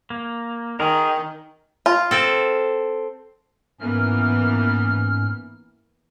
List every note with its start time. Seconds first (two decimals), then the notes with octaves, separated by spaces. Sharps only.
0.10 A#3
0.80 D#3 G#4 A#4
1.86 F4
2.11 C4 A4
3.80 G#2 E3 A#3 B3 C#4 F6